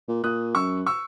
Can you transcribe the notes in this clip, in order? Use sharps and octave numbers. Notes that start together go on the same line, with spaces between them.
A#2
A#2 D#6 F#6
F#2 C#6 E6
C#6 E6